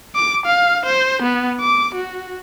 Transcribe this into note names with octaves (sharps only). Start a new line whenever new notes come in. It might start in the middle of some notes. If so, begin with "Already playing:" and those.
D6
F5
C5
B3
D6
F#4